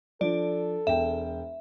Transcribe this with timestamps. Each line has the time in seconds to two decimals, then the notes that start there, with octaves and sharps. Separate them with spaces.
0.21 F3 D4 A4 D5
0.87 E1 E5 G5